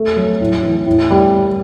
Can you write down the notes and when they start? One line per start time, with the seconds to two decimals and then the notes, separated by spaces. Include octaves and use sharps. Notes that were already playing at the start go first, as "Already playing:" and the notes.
Already playing: A3
0.17 F#3
0.41 A2
0.63 E3
0.86 A2
1.10 G3